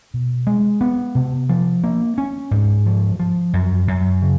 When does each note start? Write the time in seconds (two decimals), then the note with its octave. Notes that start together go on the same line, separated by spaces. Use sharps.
0.14 B2
0.47 G#3
0.81 B3
1.15 C3
1.50 F3
1.84 A#3
2.18 C#4
2.51 G#2
2.86 F3
3.20 F3
3.53 F#2
3.88 F#2
4.22 C#3